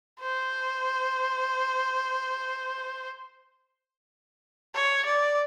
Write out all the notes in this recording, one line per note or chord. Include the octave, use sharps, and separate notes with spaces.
C5
C#5
D5